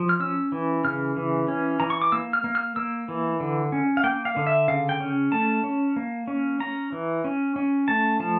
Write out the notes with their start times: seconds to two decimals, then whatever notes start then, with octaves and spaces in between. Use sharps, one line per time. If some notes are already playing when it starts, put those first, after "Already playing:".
Already playing: F3
0.09 F6
0.20 C#4 E6
0.52 E3
0.84 C#3 F6
1.17 E3
1.48 C#4
1.80 E3 A#5
1.90 C#6
2.02 D6
2.12 A#3 E6
2.33 F6
2.44 A#3
2.55 F6
2.76 A#3 E6
3.08 E3
3.40 D3
3.72 C#4
3.97 F5
4.04 A#3 G5
4.25 F5
4.37 D3
4.47 E5
4.68 C#3 F5
4.89 G5
5.00 C#4
5.32 A3 A5
5.64 C#4
5.96 A#3
6.28 C#4
6.60 C#4 A#5
6.92 E3
7.24 C#4
7.56 C#4
7.88 A3 A5
8.20 F3 A5